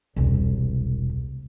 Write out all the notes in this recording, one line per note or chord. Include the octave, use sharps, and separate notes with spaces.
E1 C2